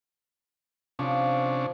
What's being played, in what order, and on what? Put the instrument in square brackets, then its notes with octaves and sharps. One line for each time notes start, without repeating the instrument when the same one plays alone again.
[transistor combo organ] C3 C#4 D4 [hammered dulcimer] F3